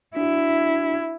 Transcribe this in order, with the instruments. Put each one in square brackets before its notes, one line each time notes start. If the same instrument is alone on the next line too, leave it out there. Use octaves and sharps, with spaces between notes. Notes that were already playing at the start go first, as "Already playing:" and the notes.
[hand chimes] D4 F#4 [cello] E4